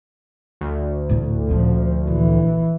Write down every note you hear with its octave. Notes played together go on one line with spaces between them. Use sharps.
D2
A2 D4
A#2 F3 C#4
A#1 E3